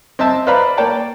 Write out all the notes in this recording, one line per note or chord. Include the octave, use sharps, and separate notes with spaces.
C4 D#5 E5 A5
B4 C5 D5 F5 A#5 B5
A#3 C#5 D5 G5 A5 A#5